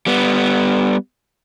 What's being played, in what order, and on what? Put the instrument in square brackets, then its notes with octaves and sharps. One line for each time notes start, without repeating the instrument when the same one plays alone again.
[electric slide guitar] G3 B3